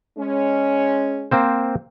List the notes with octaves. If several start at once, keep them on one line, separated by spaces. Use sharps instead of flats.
G#3 C#4
A#3 C4 C5